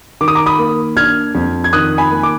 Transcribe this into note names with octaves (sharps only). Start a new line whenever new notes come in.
D#3 D6
D#6
A#5 D6
B5 D#6
A#3
D4 F6 G#6
F2
G#6
D#3 D#6 F#6
G#5 B5
A#3
D6